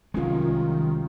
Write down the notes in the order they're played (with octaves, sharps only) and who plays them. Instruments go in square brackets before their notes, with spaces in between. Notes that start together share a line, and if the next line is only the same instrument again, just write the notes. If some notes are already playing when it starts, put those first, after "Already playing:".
[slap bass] C2 G#3 [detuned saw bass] D#3 [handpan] F#3 C#4 F4